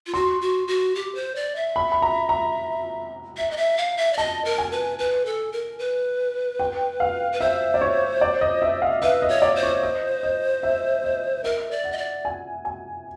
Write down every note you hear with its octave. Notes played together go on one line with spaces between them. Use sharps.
F4
F#4 C6
F#4
F#4
G4
C5
D5
E5
B5
B5
A#5
A#5
E5
D#5
E5
F5
E5
D5
D#5 A5
A#4
G#5
B4
B4
A4
A#4
B4
G5
F5
B4
C5 E5
D5
C#5
D5
D#5
E5
F5
B4 E5
D#5
C#5
D5
C5
C#5
D#5
D#5
E5
D#5
A#4 E5
D5
F#5
D#5
D5
G#5
G#5